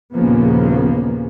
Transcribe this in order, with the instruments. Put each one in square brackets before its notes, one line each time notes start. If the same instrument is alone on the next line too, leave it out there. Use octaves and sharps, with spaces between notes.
[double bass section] A#1 D#2 C#3 F3 A#3 B3